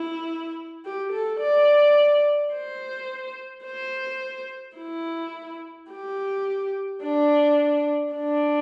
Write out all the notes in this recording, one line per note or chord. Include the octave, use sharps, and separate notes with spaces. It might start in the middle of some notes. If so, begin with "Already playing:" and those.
Already playing: E4
G4
A4
D5
C5
C5
E4
G4
D4
D4